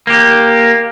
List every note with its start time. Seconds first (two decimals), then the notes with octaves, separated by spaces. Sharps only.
0.07 A#3 G4